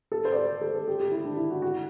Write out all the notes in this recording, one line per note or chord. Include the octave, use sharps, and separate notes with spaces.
A4
C5
D5
C5
A4
A4
G4
G4
E4
D4
E4
F#4
F#4